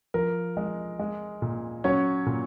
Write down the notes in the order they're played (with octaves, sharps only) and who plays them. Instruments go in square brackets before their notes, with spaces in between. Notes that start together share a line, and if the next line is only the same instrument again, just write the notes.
[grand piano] F3 A#4
G#3
G#3
A#2
F#3 C#4 C#5
A#2